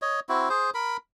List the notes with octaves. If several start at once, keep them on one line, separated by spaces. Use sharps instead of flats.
C#5 D#5
C4 E4 F#4
G#4 C5
A#4 B5